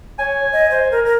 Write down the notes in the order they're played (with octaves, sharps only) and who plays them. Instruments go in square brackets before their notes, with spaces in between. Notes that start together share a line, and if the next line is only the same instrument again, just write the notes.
[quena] C#5 [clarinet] G#5
[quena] D#5
C5
A#4
A#4